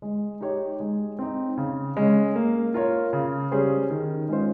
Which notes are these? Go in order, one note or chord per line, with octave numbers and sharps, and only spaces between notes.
G#3
D#4 G4 C#5
G#3
C4 D#4
C#3
G#3 C#4
A#3
F4 A#4 C#5
C#3
G3 C#4 G#4 C5
D#3
G#3 C#4 F4 C5